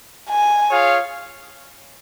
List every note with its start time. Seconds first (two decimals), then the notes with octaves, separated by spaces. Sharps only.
0.30 G#5
0.70 F4 G#4 C#5 F5